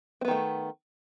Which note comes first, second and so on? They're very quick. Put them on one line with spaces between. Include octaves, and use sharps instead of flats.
C4 B3 D#3 A3